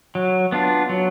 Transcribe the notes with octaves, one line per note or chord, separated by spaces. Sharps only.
F#3
B3 D4 F4
F#3